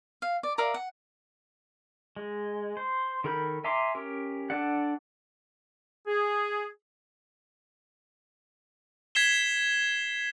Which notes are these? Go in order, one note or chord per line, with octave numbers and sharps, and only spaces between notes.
F5
D5
A#4 D5 E5 F5
F#5
G#3
C5
D#3 A4 A#4 B5 G6
E5 G#5 A#5 C6 D6
C#4 G4 A#4
D4 A4 D5 F#5
G#4
G#6 B6 C7 E7 G7